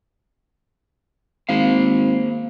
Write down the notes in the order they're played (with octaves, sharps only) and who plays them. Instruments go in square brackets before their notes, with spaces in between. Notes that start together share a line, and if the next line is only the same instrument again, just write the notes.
[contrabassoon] G#1 [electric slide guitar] A#3 C5 F5